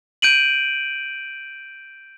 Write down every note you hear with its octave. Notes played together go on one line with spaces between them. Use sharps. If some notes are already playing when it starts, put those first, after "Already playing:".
G6 D7 D#7 F#7